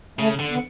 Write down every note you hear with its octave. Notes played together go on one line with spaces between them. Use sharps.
C#3 A3
D3
B3